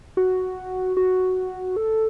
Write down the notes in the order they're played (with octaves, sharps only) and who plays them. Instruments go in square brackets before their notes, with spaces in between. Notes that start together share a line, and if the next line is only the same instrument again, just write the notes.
[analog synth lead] F#4
F#4
A4